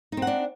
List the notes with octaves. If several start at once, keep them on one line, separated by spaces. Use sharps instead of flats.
C4 D4 D#4 F#5